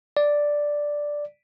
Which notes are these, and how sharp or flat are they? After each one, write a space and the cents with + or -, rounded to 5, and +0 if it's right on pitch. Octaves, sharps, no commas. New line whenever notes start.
D5 +0